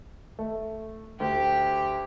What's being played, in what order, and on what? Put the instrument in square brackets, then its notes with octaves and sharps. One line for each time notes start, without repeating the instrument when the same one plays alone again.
[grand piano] A3
[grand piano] D2 [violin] G4